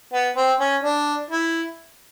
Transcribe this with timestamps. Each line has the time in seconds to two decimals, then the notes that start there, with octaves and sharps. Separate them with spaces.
0.13 B3
0.36 C4
0.60 C#4
0.83 D4
1.30 E4